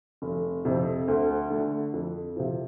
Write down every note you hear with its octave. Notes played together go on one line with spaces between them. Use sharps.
F1
F2 C3 F3 C4
D2
D3 A3
F2
C3 F3